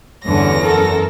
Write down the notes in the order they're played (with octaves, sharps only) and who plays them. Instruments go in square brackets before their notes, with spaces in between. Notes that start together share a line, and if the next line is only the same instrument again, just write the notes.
[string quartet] E2 C#4 A#6 [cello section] G2 D3
[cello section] F#2 A4 A#4